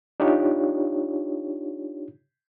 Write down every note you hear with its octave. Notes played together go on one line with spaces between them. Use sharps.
D4 D#4 F4 G4 C#5